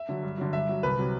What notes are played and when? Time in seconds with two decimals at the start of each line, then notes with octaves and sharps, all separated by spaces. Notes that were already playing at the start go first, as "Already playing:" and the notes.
Already playing: E5
0.09 D3 F#3
0.23 G2
0.38 D3 F#3
0.53 G2 E5
0.69 F#3
0.83 C2 B4
0.98 C3 F#3